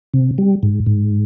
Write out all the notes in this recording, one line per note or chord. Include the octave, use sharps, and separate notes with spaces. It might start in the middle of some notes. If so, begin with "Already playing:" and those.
C3
G3
G#2
G#2